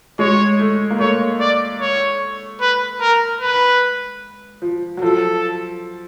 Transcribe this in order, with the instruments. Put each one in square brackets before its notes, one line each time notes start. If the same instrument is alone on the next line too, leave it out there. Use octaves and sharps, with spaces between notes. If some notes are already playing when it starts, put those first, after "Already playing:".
[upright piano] G#3 [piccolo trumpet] C#5
[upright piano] A3
A#3
[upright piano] A3 [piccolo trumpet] C#5
[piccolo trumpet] D5
C#5
B4
A#4
B4
[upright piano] F3
F#3
[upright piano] F3 [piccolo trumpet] A4